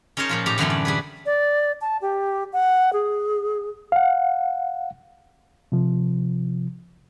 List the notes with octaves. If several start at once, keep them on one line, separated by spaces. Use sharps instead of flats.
C#4 D#4 A#4 C5 C#5 A5
A#2 F3 F4
A2 D#4 G4 A#5
F#2 D3 E3 A3 C4 C#4
D5
G3 G#4 B4
D5
A5
G4
F#5
G#4
F5 F#5
C3 F3